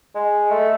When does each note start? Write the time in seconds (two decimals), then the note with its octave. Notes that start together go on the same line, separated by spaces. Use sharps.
0.15 G#3
0.51 A3